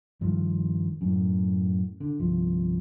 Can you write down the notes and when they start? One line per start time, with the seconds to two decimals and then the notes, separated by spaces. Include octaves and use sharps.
0.21 G2 D#3 F3
1.01 F#2 A2
2.00 D3
2.19 G1 C2 F3